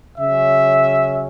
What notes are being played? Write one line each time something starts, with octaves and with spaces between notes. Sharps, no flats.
C#3 F#3 C#4 E5